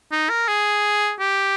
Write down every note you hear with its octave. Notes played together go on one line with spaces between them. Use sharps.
D#4
A#4
G#4
G4